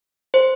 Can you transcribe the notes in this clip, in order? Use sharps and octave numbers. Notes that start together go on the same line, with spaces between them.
C5